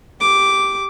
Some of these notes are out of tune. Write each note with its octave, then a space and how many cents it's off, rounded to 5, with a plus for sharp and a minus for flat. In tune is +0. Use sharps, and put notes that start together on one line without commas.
G4 +0 D6 -5